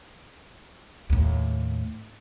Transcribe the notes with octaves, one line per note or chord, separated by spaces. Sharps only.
D#2 A2